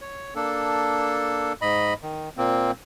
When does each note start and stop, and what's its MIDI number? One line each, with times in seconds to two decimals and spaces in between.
0.01 0.34 73
0.35 1.53 58
0.35 1.53 62
0.35 1.53 69
1.62 1.94 44
1.62 1.94 75
1.62 1.94 83
2.02 2.29 51
2.37 2.71 46
2.37 2.71 58
2.37 2.71 60